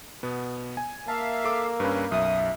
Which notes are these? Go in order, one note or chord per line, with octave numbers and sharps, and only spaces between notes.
B2 B3
G#5
A#3 E5 F5 A5
A4 D6 E6
G2 C#4 B4
B1 F#2 E5 D#6